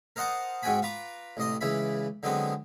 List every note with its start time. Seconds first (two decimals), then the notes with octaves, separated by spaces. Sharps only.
0.16 A#4 C5 D#5 F#5 A5 A#5
0.63 G#2 C4 F#4 G5 G#5 B5
0.82 F4 B4 A#5 D6
1.37 A1 C3 D#5 C6
1.61 C#2 C#3 E3 E4 B5
2.23 D3 F#3 G#3 B3 C4